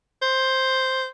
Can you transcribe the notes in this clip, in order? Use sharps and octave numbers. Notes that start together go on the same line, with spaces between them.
C5